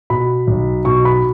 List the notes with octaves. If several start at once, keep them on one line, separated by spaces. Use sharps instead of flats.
B2 B5
B1
B2 C#6
B5